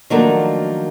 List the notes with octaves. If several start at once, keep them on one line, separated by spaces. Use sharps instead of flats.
D#3 F3 F#3 A3 A#3 D4